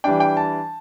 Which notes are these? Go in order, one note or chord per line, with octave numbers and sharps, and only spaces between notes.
E3 G3 D4 G5
G5
A5